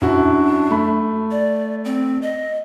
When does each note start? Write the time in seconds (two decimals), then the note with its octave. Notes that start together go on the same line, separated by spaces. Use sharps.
0.02 F#2 D4 E4 F#4
0.71 A3 B5
1.31 D5
1.85 C4
2.22 D#5